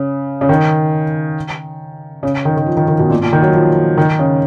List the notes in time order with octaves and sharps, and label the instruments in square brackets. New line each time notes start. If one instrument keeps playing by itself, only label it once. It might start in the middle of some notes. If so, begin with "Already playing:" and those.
Already playing: [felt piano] C#3
C#3
D#3
C#3
D#3
D#3
F3
D#3
D#3
B2
A#2
A#2
D#3
F#3
F3
D#3
C#3